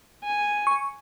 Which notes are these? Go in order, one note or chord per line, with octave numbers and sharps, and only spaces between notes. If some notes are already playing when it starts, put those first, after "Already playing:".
G#5
C#6